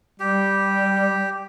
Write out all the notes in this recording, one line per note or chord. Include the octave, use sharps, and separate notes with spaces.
G3 G4